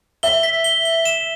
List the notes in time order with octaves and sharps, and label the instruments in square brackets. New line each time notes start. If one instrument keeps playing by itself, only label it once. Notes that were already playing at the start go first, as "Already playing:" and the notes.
[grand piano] E5 [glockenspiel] G7
[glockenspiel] B6
G7
G7
E7